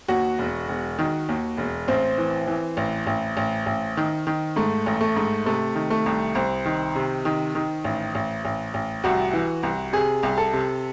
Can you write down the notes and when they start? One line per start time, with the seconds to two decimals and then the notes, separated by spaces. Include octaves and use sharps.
0.08 D#2 F#4
0.38 E1
0.69 E1
0.99 D#3
1.29 D#2
1.57 E1
1.88 A1 C4
2.18 E3
2.47 E3
2.77 A1
3.07 A1
3.37 A1
3.66 A1
3.97 D#3
4.27 D#3
4.56 G#2 A3
4.86 A1
5.01 A3
5.16 G#2
5.46 C3 A3
5.75 D#3
5.90 A3
6.06 C2
6.35 C2 C4
6.66 D#3
6.95 C3
7.25 D#3
7.55 D#3
7.84 A1
8.15 A1
8.45 A1
8.74 A1
9.04 C2 F#4
9.33 E3
9.63 C2
9.93 C3 G#4
10.23 C2
10.38 A4
10.53 C3